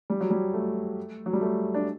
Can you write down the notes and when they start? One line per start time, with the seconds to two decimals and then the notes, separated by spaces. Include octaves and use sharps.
0.10 G3
0.21 F#3
0.30 G3
0.54 A3
1.26 F#3
1.33 G3
1.41 A3
1.74 D4